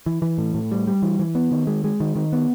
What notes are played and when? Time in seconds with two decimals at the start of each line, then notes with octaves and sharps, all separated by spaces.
0.06 E3
0.22 E3
0.38 A2
0.54 A2
0.71 G3
0.87 G3
1.02 E3
1.19 E3
1.35 B3
1.52 D#3
1.67 G#3
1.84 G#3
2.00 D#3
2.16 D#3
2.33 B3